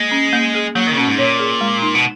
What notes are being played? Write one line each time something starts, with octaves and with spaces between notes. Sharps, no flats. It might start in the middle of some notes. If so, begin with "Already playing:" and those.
Already playing: G#3 A#3
C#4
A#3
G#4
F#3 A#3
D#3
C#3
B2 C#4
G#2
A#2 C#5
G#4
G#3
D#4
B2